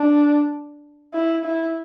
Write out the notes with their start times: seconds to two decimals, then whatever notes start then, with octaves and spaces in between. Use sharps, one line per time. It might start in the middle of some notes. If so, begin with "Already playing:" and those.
Already playing: D4
1.13 E4
1.45 E4